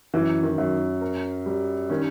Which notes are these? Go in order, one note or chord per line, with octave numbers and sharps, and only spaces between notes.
F#2 E3
D#3
F#2
A#4
G3
D#3 C#4